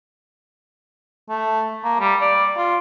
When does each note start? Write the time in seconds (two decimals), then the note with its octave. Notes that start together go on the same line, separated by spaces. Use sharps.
1.29 A3
1.84 A#3
2.00 G3
2.21 D5
2.57 F4